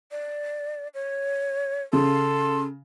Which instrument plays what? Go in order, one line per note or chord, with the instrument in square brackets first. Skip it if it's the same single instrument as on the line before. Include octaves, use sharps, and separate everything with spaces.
[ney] D5
C#5
[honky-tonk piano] C#3 [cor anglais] A4 [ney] C6